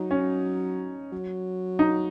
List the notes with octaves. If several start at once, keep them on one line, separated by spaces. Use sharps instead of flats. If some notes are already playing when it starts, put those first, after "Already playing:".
Already playing: F#3 D#4
C#4
F#3
D#4